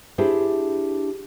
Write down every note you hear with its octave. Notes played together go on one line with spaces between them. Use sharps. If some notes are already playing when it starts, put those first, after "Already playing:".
D4 E4 G4 G#4 C5